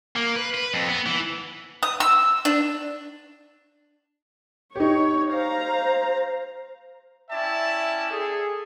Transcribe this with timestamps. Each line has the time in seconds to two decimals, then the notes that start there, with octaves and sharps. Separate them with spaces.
0.16 A#3
0.36 B4
0.54 B4
0.74 F2
0.89 B3
1.06 E3
1.83 D#6
2.00 E6
2.45 D4
4.76 D#4 G4 C#5
5.32 C5 F5 A#5
7.30 C#4 E4 D5 E5 G5 A5
8.10 G#4 A4